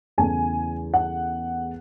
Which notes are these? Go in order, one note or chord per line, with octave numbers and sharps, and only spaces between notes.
E2 C#3 E3 A3 G#5
F#5